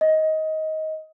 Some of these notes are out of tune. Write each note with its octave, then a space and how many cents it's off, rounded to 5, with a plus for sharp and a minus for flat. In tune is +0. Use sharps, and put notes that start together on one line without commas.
D#5 +15